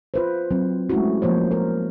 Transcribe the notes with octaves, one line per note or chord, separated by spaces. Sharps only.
F4 B4 C5
F#3 C4
G#3 A3 C#4 E4 F#4
F3 A#3 C5 C#5
A#4